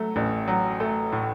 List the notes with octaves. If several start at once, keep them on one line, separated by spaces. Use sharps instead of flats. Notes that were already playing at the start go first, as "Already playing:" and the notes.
Already playing: F#3 A3
A1
F#3
A3
A2